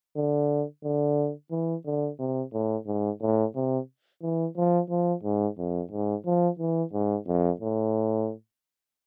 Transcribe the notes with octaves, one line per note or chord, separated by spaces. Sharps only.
D3
D3
E3
D3
C3
A2
G#2
A2
C3
E3
F3
F3
G#2
F2
G#2
F3
E3
G#2
F2
A2